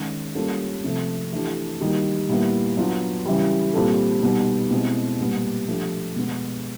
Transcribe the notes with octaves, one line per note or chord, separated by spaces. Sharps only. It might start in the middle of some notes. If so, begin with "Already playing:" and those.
Already playing: D#3 G#3 C#4
G3 A#3 C#4 F4 A4
C3 F3 A3
E3 A3 D4 G4
D#3 G3 A#3 D#4 F#4
A#2 G3 B3 E4
F#3 B3 D4 F4
C#3 E3 G3
A#2 G3 C4 F4 A4
B2 G3 B3 D#4
B2 G#3 C4 E4
A#2 G3 B3
F3 A3 D4 G4
B2 G#3 B3